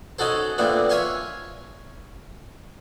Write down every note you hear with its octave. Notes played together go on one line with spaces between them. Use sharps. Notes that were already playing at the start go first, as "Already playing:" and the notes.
C#4 D#4 F#4 A4 C5
A#2 A3 B3 C4 D4
C#5 E5 F5 G#5 C6 C#6